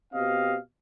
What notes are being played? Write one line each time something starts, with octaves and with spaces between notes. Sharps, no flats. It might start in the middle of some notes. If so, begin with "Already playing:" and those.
B2 C4 G4 D#5 F5